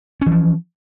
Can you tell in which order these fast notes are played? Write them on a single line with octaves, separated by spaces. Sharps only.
C#4 E3 F3